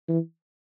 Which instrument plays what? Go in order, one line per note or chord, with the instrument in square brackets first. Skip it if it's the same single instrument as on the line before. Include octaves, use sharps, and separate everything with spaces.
[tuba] E3